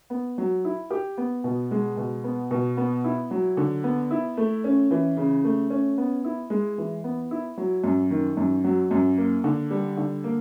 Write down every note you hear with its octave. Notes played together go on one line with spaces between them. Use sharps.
B3
F#3
E4
G4
B3
B2
G#3
B2
B3
B2
B3
E4
F#3
D3
B3
E4
A3
C#4
E3
C#3
A3
C#4
B3
E4
G#3
E3
B3
E4
F#3
F#2
D#3
F#2
F#3
F#2
A#3
D3
G3
D3
A#3